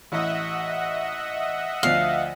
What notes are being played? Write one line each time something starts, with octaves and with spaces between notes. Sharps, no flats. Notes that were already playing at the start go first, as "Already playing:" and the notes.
A1 E4 D#5 E5 F#5
D2 F3 F5